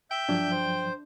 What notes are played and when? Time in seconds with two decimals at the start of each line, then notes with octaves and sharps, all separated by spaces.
0.11 E5 G5 G6
0.29 G2 F3 F#3 D4
0.51 C5